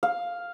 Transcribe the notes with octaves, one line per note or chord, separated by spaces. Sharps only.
F5